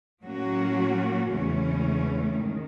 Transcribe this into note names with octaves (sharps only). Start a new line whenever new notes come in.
A2 F#3 A#3 C#4 F#4
E2 C#3 E3 A3 C#4
G#2 D#3 G#3